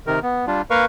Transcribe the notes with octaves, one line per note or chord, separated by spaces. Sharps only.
C3 D#3 A#4
B3
G3 D4 F4
A#3 A#4 B4 F5 C#6